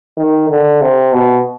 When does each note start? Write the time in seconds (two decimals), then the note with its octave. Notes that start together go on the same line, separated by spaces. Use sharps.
0.18 D#3
0.50 D3
0.81 C3
1.13 B2